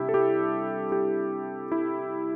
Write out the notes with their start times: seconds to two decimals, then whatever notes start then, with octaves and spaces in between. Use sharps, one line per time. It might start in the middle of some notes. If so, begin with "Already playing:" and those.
Already playing: C3 G3 D4 E4 G4 E5
0.09 A4
0.14 G4
0.92 G4
1.72 E4